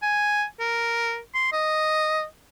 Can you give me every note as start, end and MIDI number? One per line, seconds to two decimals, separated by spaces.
0.03 0.45 80
0.60 1.19 70
1.35 1.51 84
1.53 2.24 75